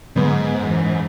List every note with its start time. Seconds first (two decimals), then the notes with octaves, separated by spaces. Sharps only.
0.16 G#2 D3 F#3 B3
0.57 F#2 E3